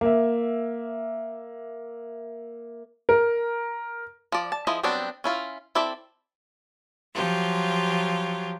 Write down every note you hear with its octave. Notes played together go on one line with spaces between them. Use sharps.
A#3 E5
A#4
F3 D5
A5
F3 E4 G#4 C5 D#5
F#3 G3 B3 C4 D4
C#4 E4 F4
C4 E4 A4 D5 E5
F3 F#3 F4 G4